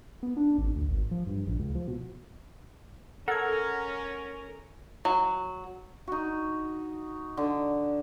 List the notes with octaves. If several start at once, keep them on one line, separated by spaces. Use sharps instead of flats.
B3
D4
G#1
D2
G#1
F3
G2
A#1
C#2
F3
B2
C#4 A4 A#4 F#5 G#6
F#3
D#4 F#4
D3